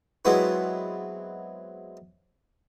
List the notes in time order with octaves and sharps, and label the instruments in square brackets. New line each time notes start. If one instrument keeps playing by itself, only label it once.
[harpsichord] F#3 G#3 B3 C4 E4 B4